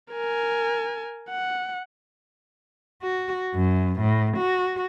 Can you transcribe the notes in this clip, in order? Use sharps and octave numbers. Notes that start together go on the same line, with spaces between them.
A#4 G#5
F#5
F#4
F#2
A2
F#4